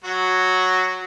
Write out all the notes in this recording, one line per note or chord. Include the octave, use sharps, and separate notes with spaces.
F#3 F#4